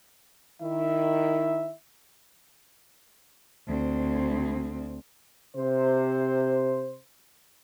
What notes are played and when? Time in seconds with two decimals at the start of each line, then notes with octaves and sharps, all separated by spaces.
0.62 D#3 E4 E5
3.68 D2 C4
5.57 C3 C5